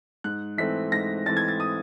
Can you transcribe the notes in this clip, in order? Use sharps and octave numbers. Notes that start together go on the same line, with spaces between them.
G#2 F#6
E3 A3 C4 B6
G#2 A#6
E3 A3 C4 A6
G#6
A6
D#6